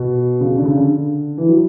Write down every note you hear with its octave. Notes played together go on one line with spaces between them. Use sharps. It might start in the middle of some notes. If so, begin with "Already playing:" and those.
Already playing: B2
C#3
D3
C#3
D3
E3
F#3